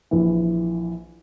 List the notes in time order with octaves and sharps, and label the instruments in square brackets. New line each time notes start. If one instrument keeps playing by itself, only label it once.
[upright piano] A#1 E3